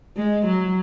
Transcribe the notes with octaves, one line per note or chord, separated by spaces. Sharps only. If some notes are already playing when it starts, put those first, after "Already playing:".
G#3
F#3